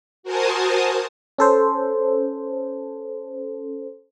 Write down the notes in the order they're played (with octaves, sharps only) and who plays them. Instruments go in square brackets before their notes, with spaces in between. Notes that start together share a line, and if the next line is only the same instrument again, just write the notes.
[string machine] F#4 A#4 C5 G#5 A5 D#6
[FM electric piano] C#4 A4 C5